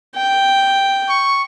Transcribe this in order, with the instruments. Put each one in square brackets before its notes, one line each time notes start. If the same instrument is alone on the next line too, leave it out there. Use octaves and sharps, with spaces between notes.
[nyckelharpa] G5
[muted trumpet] C#6